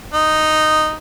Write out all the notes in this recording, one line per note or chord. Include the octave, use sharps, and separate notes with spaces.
D#4